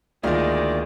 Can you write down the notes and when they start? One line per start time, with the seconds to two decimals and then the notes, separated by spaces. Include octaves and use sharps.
0.23 D2 D#3 G#3 A#3 F4 D5 D#5